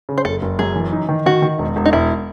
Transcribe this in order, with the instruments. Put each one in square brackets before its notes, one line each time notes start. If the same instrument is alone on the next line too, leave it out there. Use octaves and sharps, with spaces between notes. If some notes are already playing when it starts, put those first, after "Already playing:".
[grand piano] C#3
[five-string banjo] C5
[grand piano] F#1 [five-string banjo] A4
[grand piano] F#1
[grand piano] F#2 [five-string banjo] G#4
[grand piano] E3
D#4
D#3
[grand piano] D#3 [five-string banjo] F#4
[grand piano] D#3
E1
E1
[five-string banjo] D#4
[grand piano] E1 [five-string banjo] E4